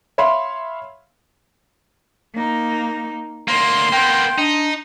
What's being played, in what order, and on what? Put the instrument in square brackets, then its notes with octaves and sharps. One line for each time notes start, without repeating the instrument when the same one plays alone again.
[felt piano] C#5 E5 F5 B5 C6
[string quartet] A#3 D#4
[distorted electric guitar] D2 A#3 [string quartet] C6
[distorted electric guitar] A#3 B3 [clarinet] G5
[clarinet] D4 [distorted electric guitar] D#4